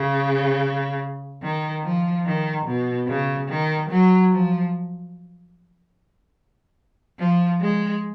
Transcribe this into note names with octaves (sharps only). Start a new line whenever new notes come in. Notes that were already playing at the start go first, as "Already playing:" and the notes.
Already playing: C#3
D#3
F3
D#3
B2
C#3
D#3
F#3
F3
F3
G#3